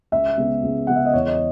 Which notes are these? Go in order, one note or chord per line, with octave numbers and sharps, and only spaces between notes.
C#2 E5
C#3 G#3 B3
C#2
C#3 G#3 B3 F#5
E5
D#5
E2 C#5
D#5